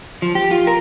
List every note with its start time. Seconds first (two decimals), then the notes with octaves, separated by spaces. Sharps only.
0.22 F3
0.35 G4
0.51 F4
0.67 A#4